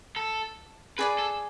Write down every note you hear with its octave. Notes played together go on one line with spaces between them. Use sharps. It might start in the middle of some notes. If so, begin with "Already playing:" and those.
A4
G#4 B4 D5 G#5
A4